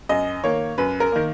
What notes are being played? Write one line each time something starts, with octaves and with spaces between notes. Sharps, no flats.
F#2 D#5
D#3 A#3 C#5
F#2 B4
A#4
D#3 A#3